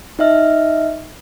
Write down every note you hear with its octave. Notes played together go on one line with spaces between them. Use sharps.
D#4 D#5 E5 F6